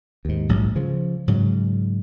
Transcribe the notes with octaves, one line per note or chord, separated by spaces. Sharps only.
D#2 G#2
A#1 G#2 F#3
C#3 F3
G#2 C#3 F#3